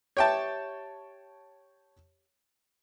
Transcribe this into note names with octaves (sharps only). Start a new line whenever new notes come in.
G4 C#5 E5 G5 A5